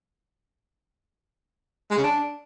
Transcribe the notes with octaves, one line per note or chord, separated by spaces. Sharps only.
G#3
C#3
D4